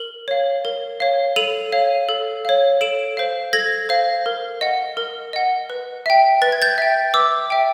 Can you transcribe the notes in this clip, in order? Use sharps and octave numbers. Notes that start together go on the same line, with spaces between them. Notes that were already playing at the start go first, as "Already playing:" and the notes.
Already playing: A#4 F#7
C#5 F5
A#4
C#5 F5
A4 D#7 F7
C#5 F5
A4
C#5 F5
A4 D7 E7
C5 F5
A4 G#6 A#6
C5 F5
A#4
D#5 F#5
A#4
D#5 F#5
B4
E5 G5
B4 A6
G#6
G6 A6
E5 G5
B4 D6 E6
E5 G5